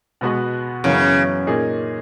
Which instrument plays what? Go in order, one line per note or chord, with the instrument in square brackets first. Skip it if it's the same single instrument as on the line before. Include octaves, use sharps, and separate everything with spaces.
[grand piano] B2 G#3 B3 F#4 B4
[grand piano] F#2 E3 B3 F#4 A#4 [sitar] C#3
[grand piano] A#2 A#3 D#4 G#4